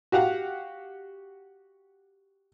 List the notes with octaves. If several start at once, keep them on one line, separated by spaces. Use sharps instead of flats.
F#4 G4 F5 F#5